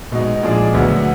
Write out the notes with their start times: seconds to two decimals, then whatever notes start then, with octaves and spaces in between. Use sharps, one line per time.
0.12 B2 G#3 D#4
0.43 A#2 F3 G#3 D4 G#4
0.73 D2 D3 F#3 B3